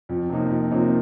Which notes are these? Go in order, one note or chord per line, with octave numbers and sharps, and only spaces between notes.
F2
C3 F3 A#3 D#4
F2
C3 F3 A#3 D#4